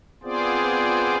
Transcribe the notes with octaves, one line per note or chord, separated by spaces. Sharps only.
B3 C4 F4 G#4 C5 D5